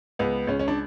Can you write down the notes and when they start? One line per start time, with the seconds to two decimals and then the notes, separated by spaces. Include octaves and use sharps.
0.19 C#2 B3
0.47 C#2 C#4
0.59 C#4
0.68 D4